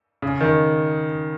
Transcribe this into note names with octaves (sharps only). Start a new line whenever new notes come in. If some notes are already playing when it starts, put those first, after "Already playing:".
C#3
D#3